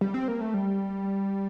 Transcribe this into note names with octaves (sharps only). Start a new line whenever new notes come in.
G3
C4
A#3
A3
G3